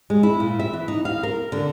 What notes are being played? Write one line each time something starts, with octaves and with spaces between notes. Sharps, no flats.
G#3
E4
A#2
E5
E3
D#4
F5
A#4
D3